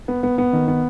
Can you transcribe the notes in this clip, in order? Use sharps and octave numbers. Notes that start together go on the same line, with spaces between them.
B3
B3
B3
D#3
B3